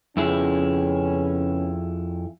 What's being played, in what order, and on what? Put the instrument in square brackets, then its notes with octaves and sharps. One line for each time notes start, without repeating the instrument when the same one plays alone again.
[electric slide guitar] F2 E4 G#4 [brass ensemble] C#3 B3 C#4